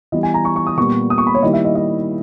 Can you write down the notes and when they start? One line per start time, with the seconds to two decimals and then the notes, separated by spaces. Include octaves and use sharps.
0.12 E3 G3 B3 D#5
0.23 G#5
0.34 A#5
0.45 C#6
0.56 C#6
0.67 D#6
0.78 A#2 G3 B3 C#6
1.10 D#6
1.18 C#6
1.27 B5
1.35 C#5
1.43 D#3 G3 A#3 E4 D#5
1.53 E5
1.65 D#5
1.75 D#5